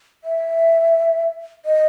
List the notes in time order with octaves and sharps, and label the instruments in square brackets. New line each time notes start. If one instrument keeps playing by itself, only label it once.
[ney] E5
D#5